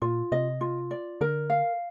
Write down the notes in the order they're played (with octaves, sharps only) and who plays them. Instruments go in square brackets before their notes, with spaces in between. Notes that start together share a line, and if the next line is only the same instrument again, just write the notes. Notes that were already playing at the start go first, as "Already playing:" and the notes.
[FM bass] A#2 [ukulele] F4
[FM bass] C3 [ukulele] D#5
[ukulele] F4
D5
[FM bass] D3 [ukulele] A#4
[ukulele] F5